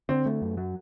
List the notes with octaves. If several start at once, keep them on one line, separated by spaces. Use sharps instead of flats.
D3 C4
A3
F#2
F#3